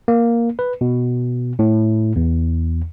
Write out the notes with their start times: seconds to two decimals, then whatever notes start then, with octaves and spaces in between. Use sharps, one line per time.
0.08 A#3
0.59 B4
0.81 B2
1.59 A2
2.16 E2